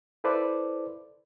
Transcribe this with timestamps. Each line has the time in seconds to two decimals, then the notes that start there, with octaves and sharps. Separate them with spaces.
0.24 E4 A4 B4 C5 D5 D6